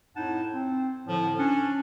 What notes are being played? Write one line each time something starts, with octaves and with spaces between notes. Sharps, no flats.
F2 A2 D#4 E4 F#5 A5
C4
A2 D3 F3
C#4 D4